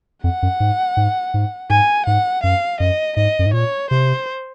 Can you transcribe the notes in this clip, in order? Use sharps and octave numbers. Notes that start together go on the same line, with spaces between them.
F2 F#5
F#2
G#2
G#2
G#2
G#2 G#5
G#2 F#5
F#2 F5
F#2 D#5
G#2 D#5
F#2
G#2
A#2 C#5
C3 C5